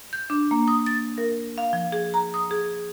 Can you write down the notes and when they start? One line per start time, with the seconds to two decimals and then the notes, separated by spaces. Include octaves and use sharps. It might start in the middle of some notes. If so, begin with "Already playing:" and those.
0.13 G6
0.30 D4
0.51 A#3
0.68 D#6
0.86 A6
1.18 A#4
1.58 F5
1.73 F3
1.92 G#4
2.14 A#5
2.34 D#6
2.51 G#4